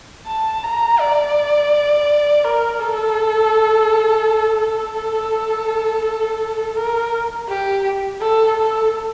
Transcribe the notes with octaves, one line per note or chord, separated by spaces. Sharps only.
A5
A#5
D5
A#4
A4
A4
A#4
G4
A4
A4